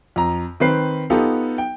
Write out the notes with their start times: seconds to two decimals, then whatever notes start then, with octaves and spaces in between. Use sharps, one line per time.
0.16 F2 A#5
0.60 D#3 C4 B4 C7
1.10 B3 D#4 F4 G4 A4
1.58 G5